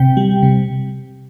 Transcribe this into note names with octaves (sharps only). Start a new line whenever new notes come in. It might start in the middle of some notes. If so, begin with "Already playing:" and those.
Already playing: C3 G5
G3
C3